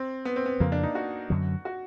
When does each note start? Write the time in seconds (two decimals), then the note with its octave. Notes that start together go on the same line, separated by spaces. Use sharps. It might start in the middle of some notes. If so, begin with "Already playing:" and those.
Already playing: C4
0.25 B3
0.36 C4
0.46 B3
0.60 F2 C#3 F3 A#3
0.72 D4
0.83 D#4
0.95 F#4
1.30 F#2 D3 F#3
1.65 F#4